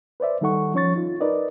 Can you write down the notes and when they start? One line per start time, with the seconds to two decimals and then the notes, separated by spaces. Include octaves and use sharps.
0.20 B4 C5 D5 E5
0.41 D#3 G3 D#4 A4 F#5 C#6
0.74 F3 C#4 C#5 C#6 A6
0.96 D#4 F4
1.20 D#4 A#4 B4 D5 D#5